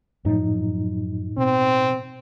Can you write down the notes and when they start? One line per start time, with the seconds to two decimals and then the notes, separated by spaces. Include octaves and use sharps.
0.25 F#2 A2 F3 F#3 D#4
1.38 B2 C4